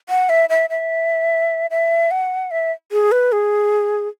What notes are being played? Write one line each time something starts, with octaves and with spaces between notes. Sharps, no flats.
F#5
E5
E5
E5
E5
F#5
E5
G#4
B4
G#4